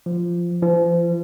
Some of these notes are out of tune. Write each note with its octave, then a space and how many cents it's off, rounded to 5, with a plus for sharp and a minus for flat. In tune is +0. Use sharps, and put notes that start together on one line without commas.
F3 -10
F3 -35